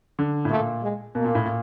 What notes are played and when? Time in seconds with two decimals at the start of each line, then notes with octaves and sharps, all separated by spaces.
0.19 D3
0.45 A2
0.50 A#2 A3
0.83 G#3
1.15 B2 A#3
1.25 A#2
1.35 A2
1.46 A#2